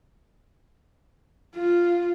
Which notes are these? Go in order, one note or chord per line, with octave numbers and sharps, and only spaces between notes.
F4